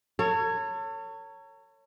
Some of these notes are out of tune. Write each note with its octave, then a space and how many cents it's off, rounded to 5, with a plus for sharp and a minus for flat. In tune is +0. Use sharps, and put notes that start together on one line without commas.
A4 +40 C#5 +0